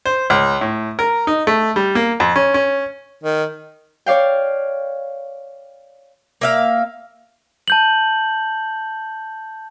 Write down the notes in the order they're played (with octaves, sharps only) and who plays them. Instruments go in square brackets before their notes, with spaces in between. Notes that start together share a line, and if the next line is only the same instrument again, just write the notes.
[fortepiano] C5
C#2
A2
A#4
D#4
A3
G3
A#3
F2
C#4
C#4
[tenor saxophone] D#3
[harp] C#5 D5 F5 G5
[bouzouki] A#3 E5 F5
[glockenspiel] A5 G6 F#7